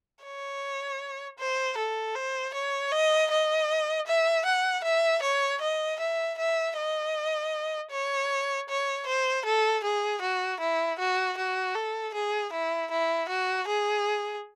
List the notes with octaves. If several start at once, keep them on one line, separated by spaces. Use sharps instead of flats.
C#5
C5
A4
C5
C#5
D#5
D#5
E5
F#5
E5
C#5
D#5
E5
E5
D#5
C#5
C#5
C5
A4
G#4
F#4
E4
F#4
F#4
A4
G#4
E4
E4
F#4
G#4